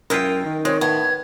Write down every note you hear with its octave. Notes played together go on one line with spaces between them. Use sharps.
F#2 G#3 E4 F4 A#4 G5
D#3
G#3 C4 C#5
A2 B3 G#6